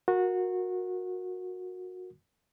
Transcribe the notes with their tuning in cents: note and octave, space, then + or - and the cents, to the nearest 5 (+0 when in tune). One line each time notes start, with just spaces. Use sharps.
F#4 -20 A#4 +0